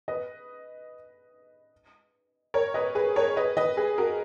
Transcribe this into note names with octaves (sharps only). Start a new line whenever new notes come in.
B4 D#5
A#4 C#5
B4 D#5
G#4 B4
A#4 C#5
B4 D#5
B4 D#5
G#4 B4
F#4 A#4